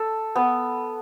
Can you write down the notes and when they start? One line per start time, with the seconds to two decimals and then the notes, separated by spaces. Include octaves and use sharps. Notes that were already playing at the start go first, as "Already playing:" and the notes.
Already playing: A4
0.36 B3